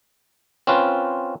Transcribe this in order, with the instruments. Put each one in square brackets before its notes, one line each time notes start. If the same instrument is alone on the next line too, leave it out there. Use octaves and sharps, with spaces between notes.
[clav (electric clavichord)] C4 C#4 F4 B4